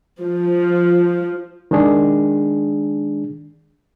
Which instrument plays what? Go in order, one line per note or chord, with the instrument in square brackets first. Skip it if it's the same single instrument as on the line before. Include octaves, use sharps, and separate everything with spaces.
[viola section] F3
[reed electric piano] D#3 G#3 D4 G#4